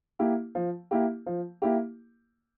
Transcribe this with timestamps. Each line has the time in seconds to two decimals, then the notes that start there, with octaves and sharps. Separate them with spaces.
0.19 A#3 E4 G4
0.55 F3
0.91 A#3 E4 G4
1.26 F3
1.62 A#3 E4 G4